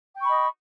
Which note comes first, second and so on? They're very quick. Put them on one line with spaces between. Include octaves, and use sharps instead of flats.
G5 C#6 B5 D#5